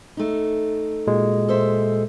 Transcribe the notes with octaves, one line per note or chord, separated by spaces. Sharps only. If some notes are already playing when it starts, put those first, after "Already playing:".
A3 D#4
A#2 G#3 F#4
A4 C5 E5